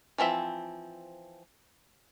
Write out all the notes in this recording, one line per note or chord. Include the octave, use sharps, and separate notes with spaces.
E3 F3 C4 E5